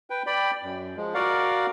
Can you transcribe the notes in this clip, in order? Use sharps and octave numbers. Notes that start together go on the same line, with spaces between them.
B4 G5
D5 G5 B5
F#2
F3 G#3
F#4 A#4 D5 F5 F#5